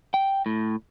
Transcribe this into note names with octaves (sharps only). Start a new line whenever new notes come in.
G5
A2